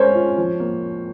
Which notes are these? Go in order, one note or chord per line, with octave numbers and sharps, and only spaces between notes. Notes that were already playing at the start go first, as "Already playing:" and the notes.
Already playing: G#3 C#4 A#4 C5 C#5
F4
F3
A#3